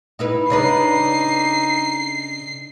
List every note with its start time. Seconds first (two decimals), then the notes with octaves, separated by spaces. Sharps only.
0.19 D#4 E4 B4
0.50 C#3 D4 D#4 B4 C7